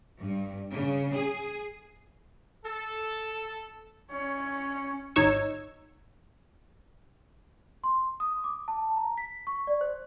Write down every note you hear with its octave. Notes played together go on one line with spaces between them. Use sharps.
G2
C#3
G#4
A4
C#4 C#5
G#1 D#4 C#5 E6
C6
D#6
D6
A5
A#5
B6
C#6
D5
C5